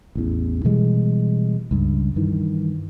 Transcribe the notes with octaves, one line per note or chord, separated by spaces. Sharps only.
A1 E2
B2 E3 G3 G#3
C#2 G2
G2 D#3 E3